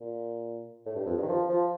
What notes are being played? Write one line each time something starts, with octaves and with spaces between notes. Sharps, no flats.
A#2
A2
G2
F2
G2
D#3
F3
F3